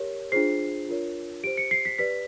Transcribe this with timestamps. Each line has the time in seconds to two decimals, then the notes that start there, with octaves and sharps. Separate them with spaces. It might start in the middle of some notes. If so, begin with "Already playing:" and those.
Already playing: G4 A#4 C#5
0.32 D4 F4 G#4 C5 C7
0.88 D4 F4 A#4 C#5
1.43 G4 C5 D7
1.57 C#7
1.71 C7
1.85 B6
1.99 G4 B4 D5 B6